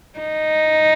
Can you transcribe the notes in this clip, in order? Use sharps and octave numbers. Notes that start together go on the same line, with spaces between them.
D#4